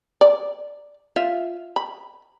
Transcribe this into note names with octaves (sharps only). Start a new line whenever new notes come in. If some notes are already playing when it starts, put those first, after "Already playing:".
D5
F4 E5
B5